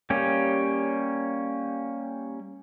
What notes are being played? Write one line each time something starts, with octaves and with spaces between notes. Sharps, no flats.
G3 A#3 C#4 G4